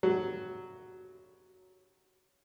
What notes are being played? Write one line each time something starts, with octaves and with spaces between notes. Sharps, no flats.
F#3